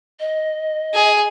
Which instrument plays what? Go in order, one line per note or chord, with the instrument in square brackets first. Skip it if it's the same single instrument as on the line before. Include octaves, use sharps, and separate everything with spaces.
[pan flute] D#5
[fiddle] G#4